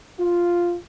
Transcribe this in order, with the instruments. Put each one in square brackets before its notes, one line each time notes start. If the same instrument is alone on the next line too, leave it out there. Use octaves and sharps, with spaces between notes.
[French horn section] F4